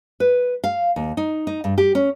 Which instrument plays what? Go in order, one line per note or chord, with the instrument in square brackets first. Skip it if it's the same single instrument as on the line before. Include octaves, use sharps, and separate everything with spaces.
[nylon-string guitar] B4
F5
D#2
D#4
D#4
G2
G4
C#4